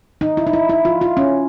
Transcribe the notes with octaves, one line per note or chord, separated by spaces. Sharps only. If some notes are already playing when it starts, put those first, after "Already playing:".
D#4
E4
D#4
E4
E4
F4
F4
C#4